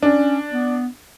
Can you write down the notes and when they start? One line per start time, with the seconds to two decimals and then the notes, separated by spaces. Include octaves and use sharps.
0.03 C#4 D4
0.53 B3